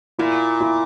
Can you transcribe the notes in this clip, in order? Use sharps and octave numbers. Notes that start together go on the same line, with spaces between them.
A#2 E4
E4